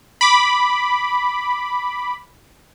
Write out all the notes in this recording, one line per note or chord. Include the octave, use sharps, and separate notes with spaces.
B5 D6